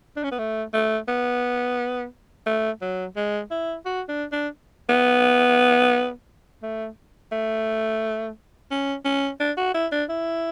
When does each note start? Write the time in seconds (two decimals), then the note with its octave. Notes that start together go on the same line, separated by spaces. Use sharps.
0.17 D4
0.23 C#4
0.31 B3
0.39 A3
0.73 A3
1.08 B3
2.46 A3
2.81 F#3
3.16 G#3
3.51 E4
3.85 F#4
4.09 D4
4.32 D4
4.89 B3
6.63 A3
7.32 A3
8.71 C#4
9.05 C#4
9.40 D4
9.57 F#4
9.74 E4
9.92 D4
10.09 E4